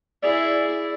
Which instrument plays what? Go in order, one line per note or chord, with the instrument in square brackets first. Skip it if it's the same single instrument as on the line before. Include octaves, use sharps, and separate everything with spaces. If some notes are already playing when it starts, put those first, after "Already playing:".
[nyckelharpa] E4 G#4 [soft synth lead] D5